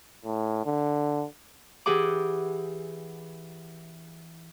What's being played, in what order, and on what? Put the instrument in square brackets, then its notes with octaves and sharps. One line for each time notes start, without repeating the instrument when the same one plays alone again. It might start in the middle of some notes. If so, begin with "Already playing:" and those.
[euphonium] A2
D3
[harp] E3 G4 G#4 F#5 D6